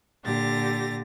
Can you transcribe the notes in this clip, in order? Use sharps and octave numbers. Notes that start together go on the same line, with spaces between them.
A#2 D3 G4 A6 A#6